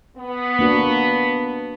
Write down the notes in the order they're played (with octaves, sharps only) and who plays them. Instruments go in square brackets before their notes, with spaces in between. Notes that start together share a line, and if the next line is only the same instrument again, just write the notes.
[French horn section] B3
[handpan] A#3 D4 F#4